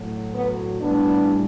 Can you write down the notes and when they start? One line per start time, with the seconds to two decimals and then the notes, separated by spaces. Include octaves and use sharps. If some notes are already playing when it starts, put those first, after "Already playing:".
Already playing: A2 F#3
0.34 B3
0.81 A2 E3 G3 B3 D4